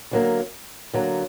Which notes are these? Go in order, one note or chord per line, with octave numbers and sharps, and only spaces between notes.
D3 F#3 A#3
D3 F#3 A#3